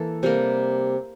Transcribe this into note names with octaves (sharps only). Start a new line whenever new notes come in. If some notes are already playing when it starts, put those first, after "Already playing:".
Already playing: E3 A#3 A4
C3 G3 A#3